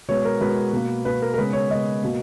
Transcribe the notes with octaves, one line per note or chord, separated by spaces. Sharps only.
B2 G#3 B3 C#5
A#4
B2 G#3 B3 B4
B2 A#3
B2 A#3 B4
A#4
A#4
C#3 G#3 B3 B4
C#5
C#3 G#3 B3 D#5
B2 A#3